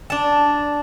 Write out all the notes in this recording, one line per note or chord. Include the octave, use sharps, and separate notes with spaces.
D4 A5